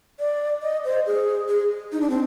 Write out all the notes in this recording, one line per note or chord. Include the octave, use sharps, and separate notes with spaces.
D5
D#5
C5
G#4
G#4
D#4
D4
C4